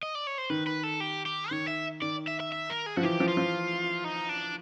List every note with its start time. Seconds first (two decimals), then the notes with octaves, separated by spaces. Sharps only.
0.03 D#5
0.15 D5
0.27 C#5
0.38 C5
0.50 D#3 B4
0.67 B4
0.83 A4
1.00 G4
1.26 G4
1.51 D#3 C#5
1.68 E5
2.02 D#3 D5
2.28 E5
2.40 E5
2.52 E5
2.70 A#4
2.86 G#4
2.96 F3 F#4
3.03 E3 G4
3.20 F3
3.28 F4
3.37 F3
4.04 D#4
4.29 D4